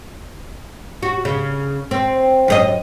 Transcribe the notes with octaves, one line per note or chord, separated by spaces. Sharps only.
F#4
C#3
C4
F#2 G#4 D#5